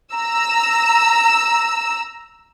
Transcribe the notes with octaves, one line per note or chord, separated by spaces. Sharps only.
A#5 E6